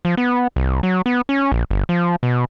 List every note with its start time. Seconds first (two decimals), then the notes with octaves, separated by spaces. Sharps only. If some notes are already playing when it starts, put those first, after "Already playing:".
0.05 F3
0.17 B3
0.56 C2
0.83 F#3
1.06 B3
1.29 C#4
1.52 A#1
1.71 G1
1.89 F3
2.23 B2